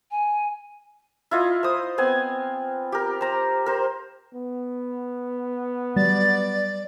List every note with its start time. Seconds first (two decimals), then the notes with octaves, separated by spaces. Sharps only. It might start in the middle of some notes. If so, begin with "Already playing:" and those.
0.11 G#5
1.31 E4 F4 D#5
1.63 C5 D#6
1.98 B3 C4 G#5
2.92 G4 A#4
3.21 C5 A#5
3.66 A#4 C5
4.34 B3
5.96 F#3 G3 D5 A6